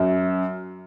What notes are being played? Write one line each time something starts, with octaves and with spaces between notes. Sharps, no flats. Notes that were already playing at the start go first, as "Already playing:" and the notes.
Already playing: F#2